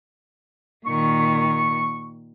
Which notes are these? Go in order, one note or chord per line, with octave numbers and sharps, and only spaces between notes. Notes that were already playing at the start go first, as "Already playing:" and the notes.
A#2 D#3 C#6